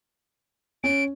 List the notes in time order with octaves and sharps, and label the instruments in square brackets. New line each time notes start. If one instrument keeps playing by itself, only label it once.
[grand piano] C#4 [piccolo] D7